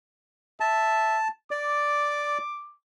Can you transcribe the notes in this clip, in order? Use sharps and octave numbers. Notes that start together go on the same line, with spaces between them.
E5 A5
D5 D6